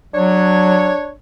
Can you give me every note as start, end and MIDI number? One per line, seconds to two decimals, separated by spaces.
0.14 0.92 54
0.14 1.11 62
0.14 1.11 73